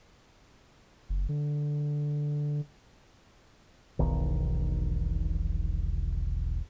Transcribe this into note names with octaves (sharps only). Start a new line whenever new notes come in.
F#1
D3
E1 B1 D#3